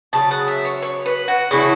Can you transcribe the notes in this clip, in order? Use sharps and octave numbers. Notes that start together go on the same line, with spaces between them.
C#3 F#3 B3 A5
F#5
E5
C#5
C#5
B4
F#4
C#3 E3 A3 E4 F#4